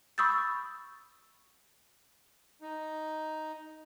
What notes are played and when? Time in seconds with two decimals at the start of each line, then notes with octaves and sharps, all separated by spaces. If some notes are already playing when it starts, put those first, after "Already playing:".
0.18 B5 C#6 D#6 E6 G6 A6
2.61 D#4